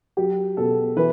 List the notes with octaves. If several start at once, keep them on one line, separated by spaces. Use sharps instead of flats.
F#3 G4
B2 A4
E3 B4